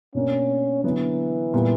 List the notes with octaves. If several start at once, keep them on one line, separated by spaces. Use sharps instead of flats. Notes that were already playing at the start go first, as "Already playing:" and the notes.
B2 A#3 C#4 D4
D3 E3 F#3 B3
A#2 G3 B3